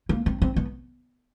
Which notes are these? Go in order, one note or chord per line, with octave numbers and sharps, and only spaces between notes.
A#3
C4
C4
B3